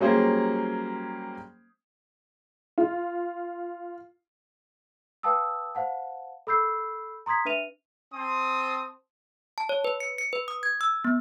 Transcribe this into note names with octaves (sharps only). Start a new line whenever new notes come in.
F#3 G3 A#3 C#4 G#4 C5
F4
B4 F5 G5 A5 D#6 E6
C5 F5 F#5 A5
A4 B5 E6 G6 C7
A#5 C6 D#6 G#6 B6
D4 B4 E5 D#7 F7
C4 C5 A5 D#6
A5
C#5
B4
C#7
C#7
B4
D#6
G#6
E6
B3